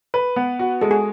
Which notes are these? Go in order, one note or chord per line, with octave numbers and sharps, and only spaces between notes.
B4
B3
F#4
G#3 A4
G#4